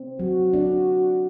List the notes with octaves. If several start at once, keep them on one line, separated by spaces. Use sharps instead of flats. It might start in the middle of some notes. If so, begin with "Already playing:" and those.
Already playing: C4
F#3 F#4
D4